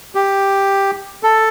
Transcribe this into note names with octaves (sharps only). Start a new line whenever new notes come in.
G4
A4